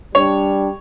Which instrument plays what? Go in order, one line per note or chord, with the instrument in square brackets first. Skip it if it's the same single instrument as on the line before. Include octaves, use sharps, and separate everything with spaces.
[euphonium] G3 [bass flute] D4 [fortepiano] C#5